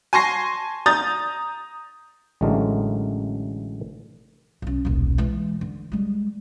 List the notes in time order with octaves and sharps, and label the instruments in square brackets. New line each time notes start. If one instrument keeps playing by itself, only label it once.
[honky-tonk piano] G#5 A5 C6 C#6 A#6 C7
A#5 D#6 G6 A6
[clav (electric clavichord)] A1 D3 F#3 G#3 A3 A#4
[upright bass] B1 C#4
D#1 B1
E3 G#3
D3
G3 G#3